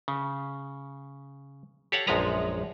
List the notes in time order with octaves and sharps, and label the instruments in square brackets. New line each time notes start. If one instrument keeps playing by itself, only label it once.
[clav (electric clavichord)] C#3
G4 A4 C#5 F5 F#5
A#1 F#2 F3 G#3 B4 A#5